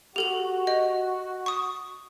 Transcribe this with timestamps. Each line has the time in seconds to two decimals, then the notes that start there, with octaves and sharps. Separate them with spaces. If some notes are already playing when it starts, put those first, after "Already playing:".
0.16 F#4 G4 A4 F#7
0.67 D#5
1.46 C#6 D#6